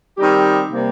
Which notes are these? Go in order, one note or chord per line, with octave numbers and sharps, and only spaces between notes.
D#3 G3 C4 D#4 G4
C3 G3 A#3